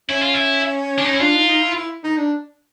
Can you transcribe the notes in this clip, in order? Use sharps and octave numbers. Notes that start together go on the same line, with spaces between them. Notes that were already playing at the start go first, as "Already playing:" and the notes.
C#4 E4
F4
E4
D4
D#4
E4
D4 F4
D#4
D#4
E4
E4
D#4
D4